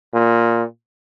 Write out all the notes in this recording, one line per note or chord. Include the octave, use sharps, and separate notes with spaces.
A#2